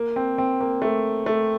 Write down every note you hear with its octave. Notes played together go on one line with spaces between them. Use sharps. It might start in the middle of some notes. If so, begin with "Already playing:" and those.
Already playing: A#3
C4
C4
A#3
A3
A3